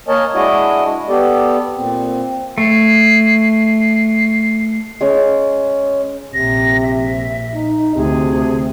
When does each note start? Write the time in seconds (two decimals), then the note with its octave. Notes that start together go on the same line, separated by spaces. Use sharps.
0.08 A#3 A#4 C#5 D#5 G#5 A5
0.34 G#3 D4 E4 F#4 D#5
1.09 B3 G4 A4 D5
1.76 A#2 C4
2.58 A3 C7
5.01 G#3 C#4
6.34 A#1 C3 A#6
6.82 E5
7.55 D#4
7.96 D2 C3 G#4